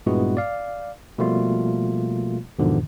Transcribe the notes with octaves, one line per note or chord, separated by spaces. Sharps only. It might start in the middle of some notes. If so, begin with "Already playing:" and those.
G2 A#2 G#3 B3 E4 F#4
D5 F5
B2 F3 G3 A3 A#3 F4
E2 G#2 B2 D3 D#3 F3